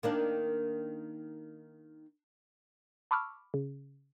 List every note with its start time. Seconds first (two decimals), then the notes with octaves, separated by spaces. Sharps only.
0.03 D#3 A#3 D4
3.11 A5 B5 C#6 D6 E6 F6
3.54 C#3